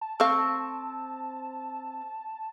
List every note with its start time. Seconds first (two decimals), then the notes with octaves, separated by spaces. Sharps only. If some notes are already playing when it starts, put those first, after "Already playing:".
0.01 A5
0.20 A3 C4 F5 C#6